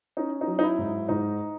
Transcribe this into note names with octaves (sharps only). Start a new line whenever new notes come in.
C#4 D#4
D#4
F#3
D#4
E4
G#2
G#2 D#4